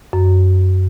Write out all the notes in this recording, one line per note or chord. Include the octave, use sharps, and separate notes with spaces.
F#2